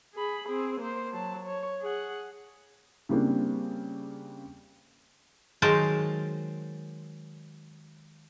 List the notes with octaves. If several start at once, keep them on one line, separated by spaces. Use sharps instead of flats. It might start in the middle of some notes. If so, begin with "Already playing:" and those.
G#4 B5
C4 G#4
A#3 C5
F#3 A5
C#5
G#4 F#5
C#3 G3 A#3 C4 D4
D#3 F#3 G#3 A#4 C5 A5